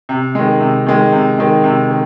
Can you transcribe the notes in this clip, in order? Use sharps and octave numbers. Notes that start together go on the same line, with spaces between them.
C3
D#3 G#3
C3
D#3 G#3
C3
D#3 G#3
C3
D#3